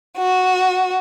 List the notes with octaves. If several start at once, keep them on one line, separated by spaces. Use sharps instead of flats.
F#4